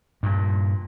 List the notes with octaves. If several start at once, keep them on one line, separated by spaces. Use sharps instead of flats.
G2 A#2